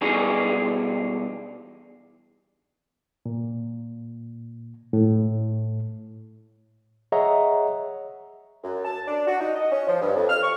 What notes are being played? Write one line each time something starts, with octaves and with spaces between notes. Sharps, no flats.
B2 E3 G3 D4 D#4 G#4
A#2
A2
G#4 C#5 D#5 E5 F#5 A#5
F#2
A5
D4
F#4
D#4
D#5
C#4
F3
G2
F2
F6
C#6